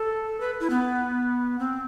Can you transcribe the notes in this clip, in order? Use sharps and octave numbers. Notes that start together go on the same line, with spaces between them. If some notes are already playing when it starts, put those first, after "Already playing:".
Already playing: A4
B4
E4
B3
C4